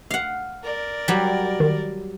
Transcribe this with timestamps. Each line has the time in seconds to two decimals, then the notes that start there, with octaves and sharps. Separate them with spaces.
0.10 F5 F#5
0.64 A#4 D5
1.08 F#3 G3
1.60 D#3